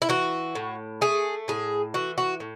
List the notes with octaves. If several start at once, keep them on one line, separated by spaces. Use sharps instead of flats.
E4
E3 F#4
A2
A3 G#4
A2 G#4
E3 F#4
F#4
A2